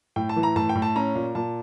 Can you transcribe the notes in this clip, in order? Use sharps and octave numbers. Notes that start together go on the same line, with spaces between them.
A2 G5
A5
E3
A#5
A2 A5
G5
A2
A5
C#4 A#5
A#2
A#2 A5